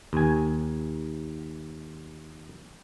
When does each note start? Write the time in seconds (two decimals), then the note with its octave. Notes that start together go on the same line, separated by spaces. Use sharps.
0.13 D#2 G#5